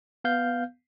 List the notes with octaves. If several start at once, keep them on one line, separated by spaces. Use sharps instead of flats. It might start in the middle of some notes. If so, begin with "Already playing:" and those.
B3 F5 G6